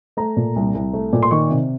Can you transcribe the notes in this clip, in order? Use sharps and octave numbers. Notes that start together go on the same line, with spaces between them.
A3 A#5
A#2
C2
C2
A3
A#2
C6
D#3 C#6
C3